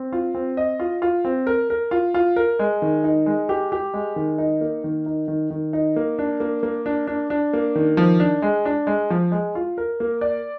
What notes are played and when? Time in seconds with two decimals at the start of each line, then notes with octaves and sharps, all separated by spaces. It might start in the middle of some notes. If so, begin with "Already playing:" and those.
Already playing: C4
0.13 F4
0.35 C4
0.57 D#5
0.80 F4
1.02 F4
1.25 C4
1.47 A#4
1.70 A#4
1.91 F4
2.14 F4
2.36 A#4
2.59 G#3
2.82 D#3
3.04 D#4
3.26 G#3
3.49 G4
3.72 G4
3.94 G#3
4.16 D#3
4.38 D#4
4.61 A#3
4.84 D#3
5.06 D#4
5.28 D#3
5.50 D#3
5.73 D#4
5.96 A#3
6.19 D4
6.40 A#3
6.63 A#3
6.86 D4
7.07 D4
7.30 D4
7.53 A#3
7.75 D#3
7.97 F3
8.20 D4
8.42 G#3
8.65 D4
8.87 G#3
9.10 F3
9.32 G#3
9.55 F4
9.78 A#4
10.00 A#3
10.21 D5